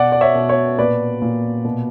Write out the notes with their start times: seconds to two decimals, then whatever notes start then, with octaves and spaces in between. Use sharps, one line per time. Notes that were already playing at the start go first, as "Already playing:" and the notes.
Already playing: B2 D5 F#5
0.12 D5
0.21 C#5 E5
0.35 B2
0.49 C#5 E5
0.79 A#2 B4 D5
1.22 A#2
1.65 B2